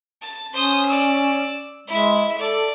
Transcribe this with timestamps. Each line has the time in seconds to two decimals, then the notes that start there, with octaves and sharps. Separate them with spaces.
0.22 A5
0.53 C#4 C5 D#6
0.87 D5 E6
1.88 G#3 E4 E5
2.38 A4 D5